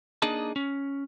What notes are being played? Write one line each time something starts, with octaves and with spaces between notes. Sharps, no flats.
A#3 D4 D#4 G#4 D#5 A5
C#4